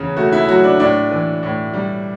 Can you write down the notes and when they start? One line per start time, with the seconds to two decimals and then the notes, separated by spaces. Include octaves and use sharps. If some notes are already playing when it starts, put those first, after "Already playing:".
Already playing: E2 C#3
0.16 A3 F#4
0.32 E4
0.48 F#3 F#4
0.64 D4
0.80 A2 D4
1.11 E3
1.43 A2
1.73 G3